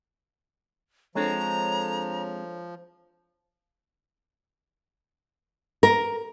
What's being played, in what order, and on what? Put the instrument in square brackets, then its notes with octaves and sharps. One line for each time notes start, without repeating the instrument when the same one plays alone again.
[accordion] F3 [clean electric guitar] G#3 C4 [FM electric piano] D4 A4 C#5 [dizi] A#5
[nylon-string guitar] A#4